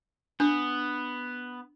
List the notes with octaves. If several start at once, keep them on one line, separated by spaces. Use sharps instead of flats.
B3 D4